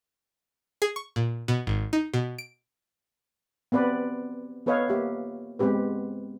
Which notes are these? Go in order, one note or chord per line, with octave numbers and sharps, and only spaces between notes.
G#4
C#6
A#2
B2
G#1
D#4
B2
D7
B3 C4 B4 D5
B3 A4 B4 C#5 D#5 F5
A#3 G4 E5
G#3 B3 C4 G4 B4